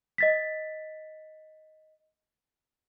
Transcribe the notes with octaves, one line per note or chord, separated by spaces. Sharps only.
D#5 A6 B6